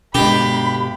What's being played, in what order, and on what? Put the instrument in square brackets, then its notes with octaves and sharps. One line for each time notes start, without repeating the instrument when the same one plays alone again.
[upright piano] G1 G#3 [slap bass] B2 [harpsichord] G4 [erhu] B5